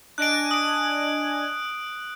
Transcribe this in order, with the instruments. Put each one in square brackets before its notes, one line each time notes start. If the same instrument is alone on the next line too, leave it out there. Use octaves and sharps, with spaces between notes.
[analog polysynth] D4 D#5 G#5 [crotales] F#6 D7
[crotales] D#6 D7